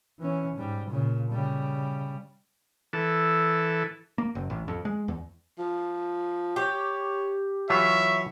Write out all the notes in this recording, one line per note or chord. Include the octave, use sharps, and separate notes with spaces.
E3 C#4
G#2 G3
A#2 C#3
C#3 G3
E3 A4
A#3
F#1
A1
F2
G#3
E2
F3
G4 C#5
E3 F#3 F4 C#5 E5